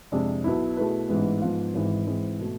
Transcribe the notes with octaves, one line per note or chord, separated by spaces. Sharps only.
F2 C3 G#3 D4
B1 B2 B3 E4
B2 A3 E4 G#4 B4
A1 G#2 E3 G#3 B3
G#2 F3 B3 F4
G#1 G#2 E3 G#3
G#2 E3 G#3 C4
B2 A3